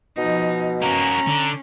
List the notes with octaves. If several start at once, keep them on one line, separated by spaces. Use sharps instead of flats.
B2 F3 D#4
A#3 C#4 F#4 A#5
D3